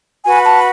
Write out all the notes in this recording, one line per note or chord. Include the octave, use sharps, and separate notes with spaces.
F#4 B4 G#5
A5